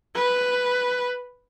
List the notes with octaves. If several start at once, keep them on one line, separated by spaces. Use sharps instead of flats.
B4